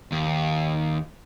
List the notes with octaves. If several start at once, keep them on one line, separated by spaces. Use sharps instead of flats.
D#2